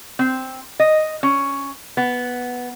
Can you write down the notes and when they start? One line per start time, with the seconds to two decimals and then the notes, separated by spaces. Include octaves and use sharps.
0.19 C4
0.80 D#5
1.23 C#4
1.97 B3